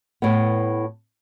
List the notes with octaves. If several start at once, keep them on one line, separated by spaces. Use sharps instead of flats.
A2 B3